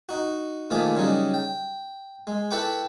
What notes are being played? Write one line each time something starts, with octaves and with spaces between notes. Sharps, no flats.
D#4 F#4
A#2 D#3 F3 A3 G#4 D6
C#3 F#3 G3 D#4
G5
G#3
E4 A4 B4 G5 C#6 D6